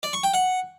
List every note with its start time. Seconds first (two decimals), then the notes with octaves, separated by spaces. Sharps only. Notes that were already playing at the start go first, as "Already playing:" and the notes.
0.03 D5
0.13 C#6
0.23 G5
0.34 F#5